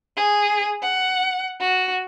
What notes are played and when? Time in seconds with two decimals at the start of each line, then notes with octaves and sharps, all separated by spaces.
0.17 G#4
0.82 F#5
1.60 F#4